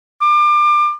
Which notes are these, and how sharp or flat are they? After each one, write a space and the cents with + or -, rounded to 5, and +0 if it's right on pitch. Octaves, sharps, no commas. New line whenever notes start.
D6 +30